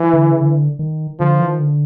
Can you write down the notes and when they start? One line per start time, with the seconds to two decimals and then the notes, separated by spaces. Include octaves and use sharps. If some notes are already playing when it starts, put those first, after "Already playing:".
Already playing: E3
0.13 D3
0.31 C#3
0.40 D3
0.79 D#3
1.20 D3 F3
1.40 E3
1.49 D#3
1.59 D3